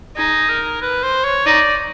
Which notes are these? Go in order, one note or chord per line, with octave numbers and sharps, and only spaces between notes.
D#4 G#4
A#4
B4
C5
C#5
D#4 D5